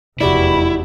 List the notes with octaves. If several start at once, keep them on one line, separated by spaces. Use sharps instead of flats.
F1 E2 E4 F#4 G4 D5 B5